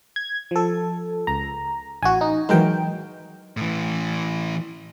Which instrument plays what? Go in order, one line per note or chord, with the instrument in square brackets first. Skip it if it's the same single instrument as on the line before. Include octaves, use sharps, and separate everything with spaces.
[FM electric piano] G#6
F3 A4
[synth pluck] C#2 [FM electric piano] A#5
[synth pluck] A1 [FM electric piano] F#4 G#5
[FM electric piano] D#4
[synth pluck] E3 F#3 G#3 [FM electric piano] D#4 A#4 G5
[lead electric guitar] A2 E3